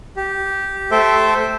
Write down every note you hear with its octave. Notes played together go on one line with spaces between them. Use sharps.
G4
A3 A4 C5 E5 G5